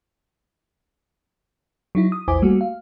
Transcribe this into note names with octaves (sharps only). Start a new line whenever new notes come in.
F#3 D#4 E4
D#6
A#1 E2 E4 C5 G#5 D6
G3 A3 A#3 F#4
F5